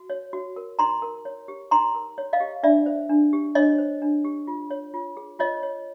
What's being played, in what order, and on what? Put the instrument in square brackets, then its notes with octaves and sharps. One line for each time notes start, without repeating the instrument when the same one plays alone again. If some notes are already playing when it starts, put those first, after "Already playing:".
Already playing: [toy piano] F#4
C#5
F#4
A#4
D#4 A#5 C6
A#4
C#5
G4
D#4 A#5 C6
A#4
C#5
D#5 F5
G4
D4 D5 E5
C5
D4
G4
D4 C#5 D#5
C5
D4
G4
F4
C#5
F4
G#4
F4 C#5 D#5
C#5